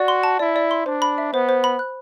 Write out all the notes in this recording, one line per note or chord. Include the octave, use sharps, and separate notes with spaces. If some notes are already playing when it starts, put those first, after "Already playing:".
Already playing: F#4 D5
C6
A5
E4 D5
D5
C6
D4 C5
B5
E5
B3 C5
C5
B5
F#6